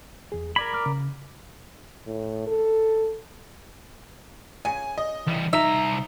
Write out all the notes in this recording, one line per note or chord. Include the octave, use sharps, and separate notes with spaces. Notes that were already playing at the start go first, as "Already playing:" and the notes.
E2 G#4
A#4 D5 B5 G#6
D6 F6
C#3
A2
A4
C#3 G#5
D#5
E3 G3
C2 D#4 E5 A#5